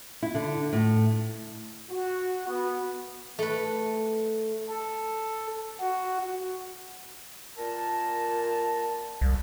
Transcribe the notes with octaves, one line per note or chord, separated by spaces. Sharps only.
E4
D3
A2
F#4
B3
A3 B4
A4
F#4
A#2 A#4 A5
C2